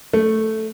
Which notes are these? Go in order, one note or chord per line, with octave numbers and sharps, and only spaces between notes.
A3